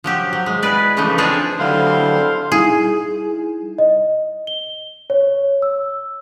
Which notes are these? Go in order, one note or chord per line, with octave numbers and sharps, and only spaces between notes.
F3 F#3 G4
F#3
G#3
E4 G#4 B4 D5
C#3 E3 F3 A3 D#4
C4 D4 F4 G#4 A4 D5
D3 F#3 G3 E4 A4 C5 F5 C6
G3 D#4 E4 G#4
D#5
G7
C#5
E6